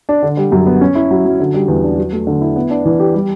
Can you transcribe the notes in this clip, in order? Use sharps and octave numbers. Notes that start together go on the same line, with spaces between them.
D4
D3
G3
F#2
B3
C#4
E4
F#3
F#3
D3
G3
E2
D4
F#3
A3
D3
E4
B3
D4
E3
G4
G3